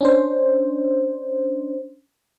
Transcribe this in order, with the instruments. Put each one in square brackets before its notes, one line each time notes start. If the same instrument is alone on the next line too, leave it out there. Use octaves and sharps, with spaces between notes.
[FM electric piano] C#4 D4 C5